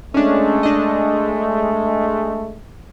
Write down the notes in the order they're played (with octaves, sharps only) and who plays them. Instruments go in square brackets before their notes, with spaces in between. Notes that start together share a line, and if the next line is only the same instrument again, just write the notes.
[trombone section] G#3 A3 [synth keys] C#4 D4
[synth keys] D4 D#5